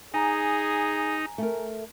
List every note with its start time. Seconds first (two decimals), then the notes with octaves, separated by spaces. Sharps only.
0.14 D#4 G#4 G#5 A#5
1.38 A3 A#4